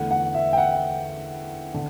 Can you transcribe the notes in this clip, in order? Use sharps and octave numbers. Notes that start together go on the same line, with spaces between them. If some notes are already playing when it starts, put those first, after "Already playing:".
Already playing: E2 D3 A3 F#5
F#5
E5
G5
F#5
D3